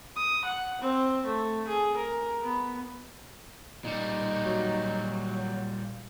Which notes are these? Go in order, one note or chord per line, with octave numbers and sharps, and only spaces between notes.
D#6
F#5
C4
A3
G#4
A#4
B3
A#2 G3 D#4
F#3